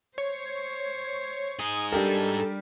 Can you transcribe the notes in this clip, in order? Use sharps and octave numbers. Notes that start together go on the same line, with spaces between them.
C5 C#5
D#4 G#4 D#6
G3 D4 G4 A4 A#4